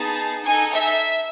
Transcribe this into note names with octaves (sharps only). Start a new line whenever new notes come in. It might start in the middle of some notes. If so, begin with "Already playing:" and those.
Already playing: B3 D#4 G#4 A5
D#4 A4 G#5
E5